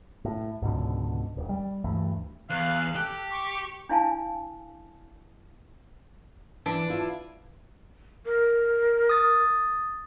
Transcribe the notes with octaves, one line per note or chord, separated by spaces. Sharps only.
A2
C#2 G#2 B2 D3
D#1
G3
D2 G2 E3 A3
E2 F5 F#6
G4 A4
C#6 D6
D4 E4 F5 G#5 A5
E3 D4
E4 F4
A#4
D#6 A6